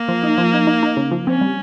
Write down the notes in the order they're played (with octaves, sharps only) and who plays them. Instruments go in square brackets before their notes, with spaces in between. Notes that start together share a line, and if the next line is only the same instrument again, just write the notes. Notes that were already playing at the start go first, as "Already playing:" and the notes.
Already playing: [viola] A#3
[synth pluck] F3
D#4
F3
D#4
D#4
D#4
C#3
F3
[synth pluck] C4 [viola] C#4
[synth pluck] G3